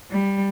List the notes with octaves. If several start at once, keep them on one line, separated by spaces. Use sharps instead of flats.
G3